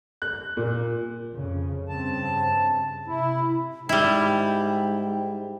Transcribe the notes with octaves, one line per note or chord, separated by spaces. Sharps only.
F#6
A#2
F2 C#3
G2 C#3 C4 A5
C3 E4
G#2 G3 E4 G5